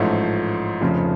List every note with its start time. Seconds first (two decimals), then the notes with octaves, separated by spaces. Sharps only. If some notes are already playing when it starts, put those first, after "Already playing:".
Already playing: A1 G#2 F3 A3 C#4
0.81 F1 F2 C#3 F3 A3